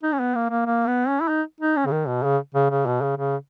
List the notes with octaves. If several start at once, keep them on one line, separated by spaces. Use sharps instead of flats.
D#4
C#4
B3
A#3
A#3
A#3
B3
C#4
E4
D#4
D#4
C#4
C#3
D#3
B2
C#3
C#3
C#3
B2
C#3
C#3